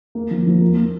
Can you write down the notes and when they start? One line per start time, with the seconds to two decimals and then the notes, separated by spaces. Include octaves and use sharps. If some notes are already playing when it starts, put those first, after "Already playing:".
0.15 A#3
0.31 F3
0.47 F3
0.61 A#3
0.77 A#3